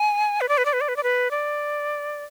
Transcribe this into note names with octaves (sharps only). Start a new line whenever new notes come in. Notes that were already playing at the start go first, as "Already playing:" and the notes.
Already playing: G#5
B4
D5
B4
D5
B4
D5
B4
D5
B4
D5